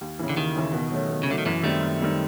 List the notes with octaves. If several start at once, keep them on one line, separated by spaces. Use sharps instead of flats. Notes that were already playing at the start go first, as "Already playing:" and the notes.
D#2
C#3 E3
D3
D#2 D#3
C#3 E3
B2
F#3 A3 C#4
B2
C#3
D3 F#3 A3 C#4
D#3
F#2 E3
D#3 G3 A3 C4
F#2
D#3 G3 C4